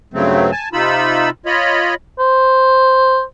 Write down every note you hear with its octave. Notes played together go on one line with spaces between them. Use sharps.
G2 C#3 F#3 A3 C4
G#5 A5
C3 D#4 F4 B5 E6
F4 C#5 D#5 B5
C5